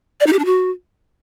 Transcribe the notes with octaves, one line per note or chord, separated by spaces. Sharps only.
D5
D#4
G4
D4
F#4